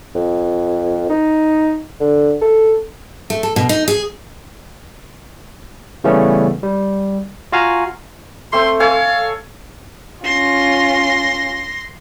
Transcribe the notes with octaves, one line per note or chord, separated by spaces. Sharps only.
F2
D#4
D3
A4
A3
A4
B2
D#4
G#4
C#3 E3 G3 A3 B3 C#4
G3
F4 F#4 F5 G#5 A#5
A3 C4 C6
A4 C#5 F5 G#5
C#4 F4 C6 A#6